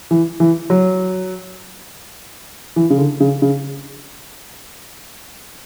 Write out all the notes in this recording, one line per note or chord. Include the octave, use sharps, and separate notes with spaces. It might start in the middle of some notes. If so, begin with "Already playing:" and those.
E3
E3
F#3
E3
C#3
D3
C#3
C#3